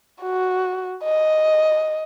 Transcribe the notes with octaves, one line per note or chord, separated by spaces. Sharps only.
F#4
D#5